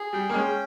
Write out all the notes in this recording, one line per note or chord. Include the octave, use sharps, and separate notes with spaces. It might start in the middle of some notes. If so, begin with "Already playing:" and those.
Already playing: G#4
G3 G5
A#3
G#3 C#4